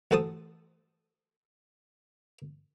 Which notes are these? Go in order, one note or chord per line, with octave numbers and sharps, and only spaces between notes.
A1 F#4 A4 C5 A5 D#6